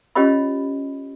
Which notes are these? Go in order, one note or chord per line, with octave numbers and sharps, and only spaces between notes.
C#4 F4 G4 C#5 D#5 B5